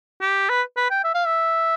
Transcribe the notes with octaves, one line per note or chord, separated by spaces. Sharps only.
G4
B4
B4
G5
E5
F5
E5